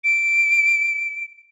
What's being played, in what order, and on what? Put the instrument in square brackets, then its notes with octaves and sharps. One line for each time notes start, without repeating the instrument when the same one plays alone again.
[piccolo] D7